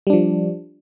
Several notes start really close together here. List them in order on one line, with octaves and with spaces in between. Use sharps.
G3 D4 F3